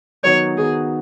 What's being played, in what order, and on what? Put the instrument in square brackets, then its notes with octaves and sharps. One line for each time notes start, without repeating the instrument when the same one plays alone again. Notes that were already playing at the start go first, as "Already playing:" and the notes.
[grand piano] D#3 F#3 B3 D#4 F#4 [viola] C#5
[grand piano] D#3 F#3 B3 D#4 F#4 [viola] G#4